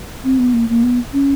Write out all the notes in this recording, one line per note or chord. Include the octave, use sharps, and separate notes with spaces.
C4
B3
A#3
A#3
B3
C#4